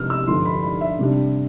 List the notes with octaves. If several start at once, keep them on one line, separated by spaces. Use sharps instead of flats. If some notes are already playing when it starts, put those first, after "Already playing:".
Already playing: C3 F3 B3 D4 E6 F6
E6
G2 D3 F3 C6
B5
B5
E5
C3 G3 D4